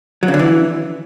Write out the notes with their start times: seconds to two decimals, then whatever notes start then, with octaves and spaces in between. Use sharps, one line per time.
0.23 F#3
0.28 C#3
0.34 D3
0.39 E3